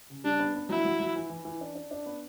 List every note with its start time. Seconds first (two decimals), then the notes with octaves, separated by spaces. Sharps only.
0.10 C#3
0.24 G3 D4
0.39 B3
0.55 B3
0.69 F#3 E4
0.85 F#3
1.00 F#3
1.16 E3
1.30 E3
1.45 E3
1.61 D4
1.75 D4
1.91 D4
2.06 B3